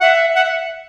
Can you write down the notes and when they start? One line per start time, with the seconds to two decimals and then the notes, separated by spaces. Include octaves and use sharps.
0.01 E5 F#5
0.36 E5 F#5